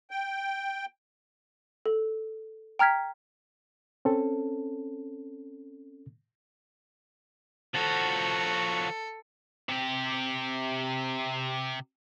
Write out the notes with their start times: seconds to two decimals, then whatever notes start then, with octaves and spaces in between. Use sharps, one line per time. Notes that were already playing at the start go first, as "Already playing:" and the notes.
0.11 G5
1.86 A4
2.79 G5 A#5 F6 G#6 B6
4.05 C4 C#4 A4
7.75 F3 F#4 A4
9.69 C3 G4